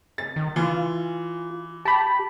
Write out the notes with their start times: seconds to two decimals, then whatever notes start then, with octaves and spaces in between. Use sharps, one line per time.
0.18 A6
0.36 D#3
0.56 E3 F4
1.85 G4 A5 B5